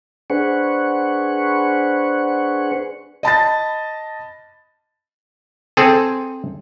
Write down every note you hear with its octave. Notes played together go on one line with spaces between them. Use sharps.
D4 G#4 B4 C5 F#5 C#6
D#5 A5 B5 A6
C4 G#4 A4